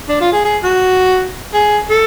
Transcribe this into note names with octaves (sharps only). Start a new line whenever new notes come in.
D4
F4
G#4
G#4
F#4
G#4
A4